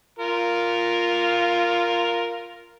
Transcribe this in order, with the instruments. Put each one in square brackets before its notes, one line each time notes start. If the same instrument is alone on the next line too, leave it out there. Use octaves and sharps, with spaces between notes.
[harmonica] F4 A#4